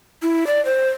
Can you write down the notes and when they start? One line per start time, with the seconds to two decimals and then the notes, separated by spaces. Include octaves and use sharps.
0.22 E4
0.47 D5
0.65 C5